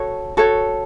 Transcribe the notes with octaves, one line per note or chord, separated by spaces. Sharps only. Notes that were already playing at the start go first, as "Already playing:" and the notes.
Already playing: F#4 A4 C#5
F#4 A4 C#5